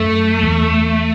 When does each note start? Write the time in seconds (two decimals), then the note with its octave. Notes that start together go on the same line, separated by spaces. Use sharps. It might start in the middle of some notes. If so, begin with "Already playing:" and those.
Already playing: F#2 A3
0.43 E2